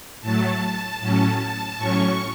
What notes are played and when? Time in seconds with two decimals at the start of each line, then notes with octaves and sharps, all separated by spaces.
0.21 A2 F#3 A3 A5
1.00 A2 F#3 C#4 A5
1.78 A2 F#3 C#4 C#6